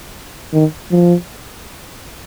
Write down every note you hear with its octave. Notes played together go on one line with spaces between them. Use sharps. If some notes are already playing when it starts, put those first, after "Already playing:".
D#3
F3